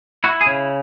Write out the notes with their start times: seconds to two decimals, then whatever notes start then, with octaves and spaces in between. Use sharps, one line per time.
0.24 E4 F#4
0.41 G#4
0.46 C#3